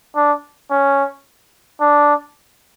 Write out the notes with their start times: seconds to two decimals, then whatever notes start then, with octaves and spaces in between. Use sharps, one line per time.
0.16 D4
0.71 C#4
1.81 D4